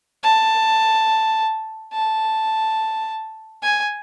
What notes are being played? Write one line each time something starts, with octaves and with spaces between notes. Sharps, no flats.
A5
A5
G#5